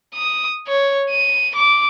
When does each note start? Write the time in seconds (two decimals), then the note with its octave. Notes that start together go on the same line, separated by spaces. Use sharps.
0.14 D#6
0.67 C#5
1.10 D#7
1.55 D6